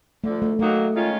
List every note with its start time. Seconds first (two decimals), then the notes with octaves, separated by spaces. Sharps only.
0.24 D2 D3 F3 A3
0.42 A3
0.59 D#3 F#3 A3 A#3 D#4 F#4
0.95 D#3 G#3 C#4 F4